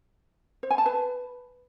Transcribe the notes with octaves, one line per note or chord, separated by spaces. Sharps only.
C5
G#5
A5
B4